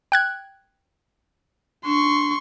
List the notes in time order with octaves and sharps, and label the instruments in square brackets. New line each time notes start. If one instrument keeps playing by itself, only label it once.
[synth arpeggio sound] G5 F#6 G#6
[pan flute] D4 [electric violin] C6 C#6